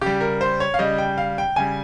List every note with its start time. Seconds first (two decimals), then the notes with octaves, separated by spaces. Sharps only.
0.01 C#3 G3 G4
0.21 A#4
0.41 C5
0.60 C#5
0.74 F5
0.79 C#3 G3 D#5
0.98 G5
1.18 F5
1.38 G5
1.56 C#3 G3 G#5